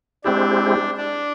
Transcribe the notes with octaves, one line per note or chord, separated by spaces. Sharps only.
G#3 C4 D4 E4 G4
D4